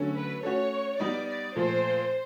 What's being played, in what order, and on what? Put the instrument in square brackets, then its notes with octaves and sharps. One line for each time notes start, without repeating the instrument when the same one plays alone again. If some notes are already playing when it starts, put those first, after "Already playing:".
Already playing: [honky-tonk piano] D3 F#3 A3 C#4
[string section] B4
[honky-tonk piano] A3 C#4 F#4 [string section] C#5
[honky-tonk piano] G3 B3 D#4 [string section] D5
[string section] D5
[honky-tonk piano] A#2 F3 A3 [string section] C5